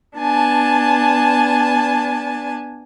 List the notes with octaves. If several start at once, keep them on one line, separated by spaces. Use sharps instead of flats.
B3 D4 G#5 A5